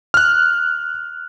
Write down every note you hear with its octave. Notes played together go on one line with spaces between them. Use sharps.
F6 F#6